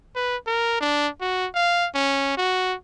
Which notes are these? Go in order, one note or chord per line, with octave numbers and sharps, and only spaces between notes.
B4
A#4
D4
F#4
F5
C#4
F#4